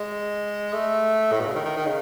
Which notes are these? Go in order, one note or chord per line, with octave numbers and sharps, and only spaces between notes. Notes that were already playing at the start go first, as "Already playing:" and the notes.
Already playing: G#3
A3
A2
B2
C#3
D#3
D#3
D#3
C#3